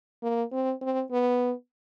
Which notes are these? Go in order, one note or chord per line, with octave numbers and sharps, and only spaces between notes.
A#3
C4
C4
B3